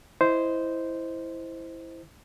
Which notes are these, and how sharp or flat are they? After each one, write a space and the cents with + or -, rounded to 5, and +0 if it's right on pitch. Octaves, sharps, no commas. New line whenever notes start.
E4 +0 C5 -10 D#5 +5